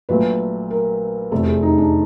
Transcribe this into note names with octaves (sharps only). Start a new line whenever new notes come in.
A#1 A#2 F#3 A3 B4
A#4
F1 E2 C3 A4
G#4
D#4
D4